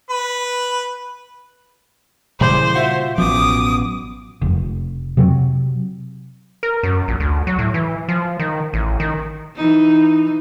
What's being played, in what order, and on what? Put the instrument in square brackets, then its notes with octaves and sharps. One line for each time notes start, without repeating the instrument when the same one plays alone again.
[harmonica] B4
[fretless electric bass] A#2 C#3 G3 [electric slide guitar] E3 G#4 D5 [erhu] C5
[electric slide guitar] F4 F#4 [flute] E5
[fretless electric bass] A1 F3 [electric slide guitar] F#2 B2 [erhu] D6 [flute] D#6
[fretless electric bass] F1
C3 F#3
[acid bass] A#4
F#2
A#1
D2
F#3
A2
E3
F3
D#3
A1
D#3
[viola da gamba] E3 D#4